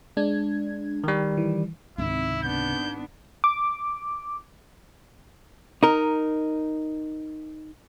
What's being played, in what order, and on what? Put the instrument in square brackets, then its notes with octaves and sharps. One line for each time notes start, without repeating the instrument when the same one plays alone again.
[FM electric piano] G#3 D4 G#6
[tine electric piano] D#3 G3
[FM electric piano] E3
[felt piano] G#1 G#2 [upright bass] C#2 C3 [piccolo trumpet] E4
[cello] B3 D4 [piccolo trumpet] G6
[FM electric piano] D6
[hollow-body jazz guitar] D#4 A#4